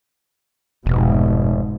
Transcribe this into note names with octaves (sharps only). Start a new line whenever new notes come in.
F1 G#2 B2